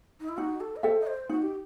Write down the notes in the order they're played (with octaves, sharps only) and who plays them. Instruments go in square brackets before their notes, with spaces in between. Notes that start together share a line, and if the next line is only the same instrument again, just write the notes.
[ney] D#4
E4
[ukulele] D#4 [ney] F#4
[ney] A4
D#5
[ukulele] A4 E5 G5 [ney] C5
[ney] D#5
C5
[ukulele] D#4 [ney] F#4
[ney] G4